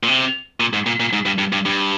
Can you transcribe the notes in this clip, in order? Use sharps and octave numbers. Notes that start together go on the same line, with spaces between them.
A#2
C3
A#2
G#2
A#2
A#2
G#2
G2
G2
G2
G2